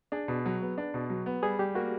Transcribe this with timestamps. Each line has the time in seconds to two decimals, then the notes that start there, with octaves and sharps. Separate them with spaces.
0.12 D4 G#4
0.28 B2
0.46 F#3
0.62 B3
0.78 D4
0.94 B2
1.10 F#3
1.26 B3
1.43 G3 G#4
1.59 G3 G4
1.75 A#3 F#4